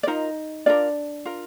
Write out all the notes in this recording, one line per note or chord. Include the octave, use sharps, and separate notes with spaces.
D5
D#4 F4 A#4 D#5
D4 F4 A#4 D5
F4 A#4